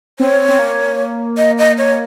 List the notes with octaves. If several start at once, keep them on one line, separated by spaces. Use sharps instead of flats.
C4 C#5
C4
A#3
D#5
D#5
C#5